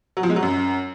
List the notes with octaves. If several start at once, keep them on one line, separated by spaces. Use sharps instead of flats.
F#3
F3
G#3
F#3
F#2